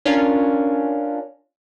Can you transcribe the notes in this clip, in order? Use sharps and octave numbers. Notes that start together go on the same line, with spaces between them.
C#4 D4 F4 A#4